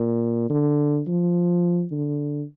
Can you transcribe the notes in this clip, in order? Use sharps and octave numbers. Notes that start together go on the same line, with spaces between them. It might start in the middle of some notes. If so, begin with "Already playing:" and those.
Already playing: A#2
D3
F3
D3